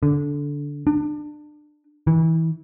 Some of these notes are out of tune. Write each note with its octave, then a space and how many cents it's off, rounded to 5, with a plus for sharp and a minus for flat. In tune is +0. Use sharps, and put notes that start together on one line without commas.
D3 -15
D4 +25
E3 -25